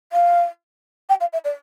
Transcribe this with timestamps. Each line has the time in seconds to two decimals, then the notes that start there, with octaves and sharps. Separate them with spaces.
0.12 F5
1.09 G5
1.20 F5
1.33 E5
1.44 D5